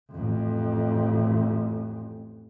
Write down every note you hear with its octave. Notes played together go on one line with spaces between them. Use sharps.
A1 F2